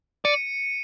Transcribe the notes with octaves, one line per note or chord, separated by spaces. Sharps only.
D5 C#7 D#7